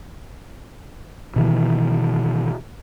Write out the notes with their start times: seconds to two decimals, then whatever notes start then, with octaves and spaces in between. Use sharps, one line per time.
1.36 B2 D#3 E3